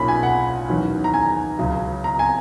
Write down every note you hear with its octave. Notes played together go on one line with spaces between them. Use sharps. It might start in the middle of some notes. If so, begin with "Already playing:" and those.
Already playing: B1 A#2 A#3 C#4 B5
G#5
F#5
E2 D#3 F#3 C#4
A#5
G#5
C#2 C#3 F#3
A#5
G#5